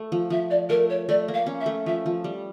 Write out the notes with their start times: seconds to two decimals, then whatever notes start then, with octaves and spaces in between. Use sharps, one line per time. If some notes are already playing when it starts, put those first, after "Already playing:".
Already playing: A3
0.12 F3
0.30 F3 E5
0.50 D5
0.69 A3 A#4
0.90 C#5
1.09 A3 D5
1.28 A#3
1.34 F5
1.46 C#4
1.60 E5
1.66 A3
1.86 F3 E5
2.06 F3
2.24 G3